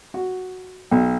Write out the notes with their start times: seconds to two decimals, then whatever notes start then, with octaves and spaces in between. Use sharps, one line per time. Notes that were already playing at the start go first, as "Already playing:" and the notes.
0.14 F#4
0.91 B1